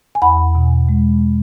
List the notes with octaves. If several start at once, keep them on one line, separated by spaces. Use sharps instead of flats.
G#5
E2 F#5 B5
B2
G#3